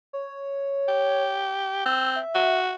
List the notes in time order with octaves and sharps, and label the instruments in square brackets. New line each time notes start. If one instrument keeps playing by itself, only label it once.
[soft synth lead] C#5
[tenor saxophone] G4
[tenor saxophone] C4 [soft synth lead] E6
[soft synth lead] E5
[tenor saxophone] F#4